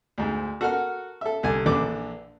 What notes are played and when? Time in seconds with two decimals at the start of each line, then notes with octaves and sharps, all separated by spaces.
0.18 D2 G#2
0.61 F#4 A4 A#4 F#5 F6
1.21 A4 E5
1.43 C2 D3 G#5
1.66 A#1 D3 E3 D6